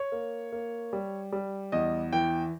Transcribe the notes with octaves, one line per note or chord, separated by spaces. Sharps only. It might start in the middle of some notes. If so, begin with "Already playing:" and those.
Already playing: C#5
A#3
A#3
G3
G3
E2 D#5
E3 G5